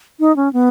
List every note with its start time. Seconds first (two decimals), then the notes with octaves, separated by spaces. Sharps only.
0.20 D#4
0.36 C#4
0.53 B3